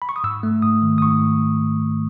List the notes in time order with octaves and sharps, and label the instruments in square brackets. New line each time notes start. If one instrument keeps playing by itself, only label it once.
[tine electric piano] B5
C#6
D#6
G#2 E6
A3
G#2 D#6
D#3
D#6
G#2 C#6
A3